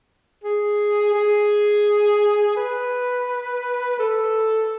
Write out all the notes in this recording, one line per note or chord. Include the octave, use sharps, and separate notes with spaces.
G#4
G#4
B4
A4